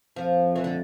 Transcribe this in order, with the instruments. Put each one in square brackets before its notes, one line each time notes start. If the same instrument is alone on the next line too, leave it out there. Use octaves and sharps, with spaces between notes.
[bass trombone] F2 [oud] F3
[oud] E3
D3